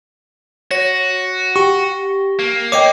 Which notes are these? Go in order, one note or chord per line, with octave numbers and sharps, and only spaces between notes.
F#4 C#5 A#6
G4 C#6
A#3
C#5 D#5 G5 D6 C7